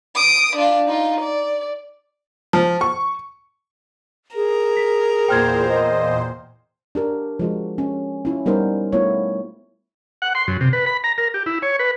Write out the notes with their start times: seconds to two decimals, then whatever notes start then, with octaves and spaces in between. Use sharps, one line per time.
0.15 D#6 D7
0.56 D4 F4
0.87 D#4 F4
1.20 D5
2.53 F3
2.81 C#6
4.35 G#4 A#4
4.77 B6
5.28 E2 A#2 C5 G5 F6 G#6
5.69 D#5
6.95 D4 G4 A#4
7.39 F3 G#3 F#4
7.78 C#4
8.25 C#4 E4 F4
8.46 G3 B3 D#4 A#4 C5
8.93 A3 B3 E4 F4 C#5
10.22 F#5
10.35 C6
10.47 F#2
10.61 C3
10.73 B4
10.86 B5
11.04 A#5
11.18 A#4
11.34 G4
11.46 E4
11.62 C#5
11.79 B4